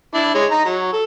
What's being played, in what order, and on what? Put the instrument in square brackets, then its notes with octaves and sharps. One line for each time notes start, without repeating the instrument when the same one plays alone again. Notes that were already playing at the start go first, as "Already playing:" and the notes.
[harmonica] D4 E4
G#3 C#5
D#4 A#5
F#3
A4